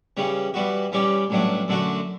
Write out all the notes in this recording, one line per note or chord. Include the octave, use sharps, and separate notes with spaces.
C#3 E3 G3 C#4
E3 G3 B3 F#4
E3 G3 C#4 G4 D5
A1 G2 F#3 A3 D4
F#2 D3 A3 D4 F#4